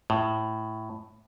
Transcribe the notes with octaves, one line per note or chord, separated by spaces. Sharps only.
A2